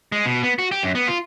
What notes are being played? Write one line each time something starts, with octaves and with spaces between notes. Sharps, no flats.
G#3
B2
B3
F#4
G4
F#2
B3
F4